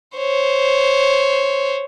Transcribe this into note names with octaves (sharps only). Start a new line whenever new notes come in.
C5 C#5